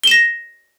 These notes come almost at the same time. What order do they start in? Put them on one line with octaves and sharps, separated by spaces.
G7 E7 A#6